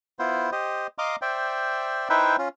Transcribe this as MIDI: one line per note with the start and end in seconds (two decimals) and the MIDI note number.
0.19 0.50 59
0.19 0.50 64
0.19 0.50 65
0.19 0.50 72
0.52 0.87 67
0.52 0.87 72
0.52 0.87 75
0.98 1.16 75
0.98 1.16 77
0.98 1.16 82
0.98 1.16 84
0.98 1.16 86
1.22 2.09 72
1.22 2.09 74
1.22 2.09 76
1.22 2.09 79
2.10 2.36 63
2.10 2.36 64
2.10 2.36 71
2.10 2.36 72
2.10 2.36 76
2.10 2.36 79
2.38 2.49 61
2.38 2.49 65